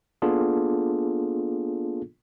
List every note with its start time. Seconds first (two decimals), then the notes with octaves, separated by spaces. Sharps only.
0.22 A#3 B3 D4 F4 G#4 A4